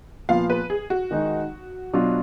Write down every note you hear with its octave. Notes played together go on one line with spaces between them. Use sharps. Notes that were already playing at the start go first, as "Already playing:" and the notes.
A#2 F3 B3 F4 F5
B4
G#4
F#4
D#3 G#3 D#4
B2 F#3 D4 F4